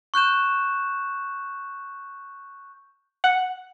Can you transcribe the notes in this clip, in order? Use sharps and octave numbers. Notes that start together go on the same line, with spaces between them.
C#6 F#6 G6 E7
F#5